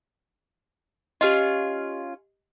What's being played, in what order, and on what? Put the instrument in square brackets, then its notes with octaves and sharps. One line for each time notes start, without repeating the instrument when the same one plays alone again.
[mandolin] C#4 F4 [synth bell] G4 D#5